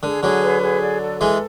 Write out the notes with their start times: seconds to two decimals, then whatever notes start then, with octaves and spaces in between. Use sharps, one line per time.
0.03 D3 G#4
0.23 D3 F#3 G#4
0.42 B4
0.62 G#4
0.82 D5
1.01 A4
1.20 E3 G#3 A4